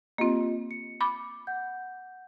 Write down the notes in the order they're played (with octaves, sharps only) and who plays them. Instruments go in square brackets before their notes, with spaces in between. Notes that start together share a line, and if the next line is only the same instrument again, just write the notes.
[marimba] A#3 C4 [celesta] F4 G4 D#5
[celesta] C#7
[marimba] B5 D6
[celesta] F#5 G6